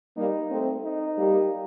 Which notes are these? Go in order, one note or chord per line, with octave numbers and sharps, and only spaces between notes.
G3 A#3 D#4
A3 C4
D#4
G3 A#3